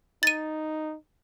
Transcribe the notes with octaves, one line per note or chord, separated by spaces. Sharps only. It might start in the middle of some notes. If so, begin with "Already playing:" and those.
D#4 A6 D#7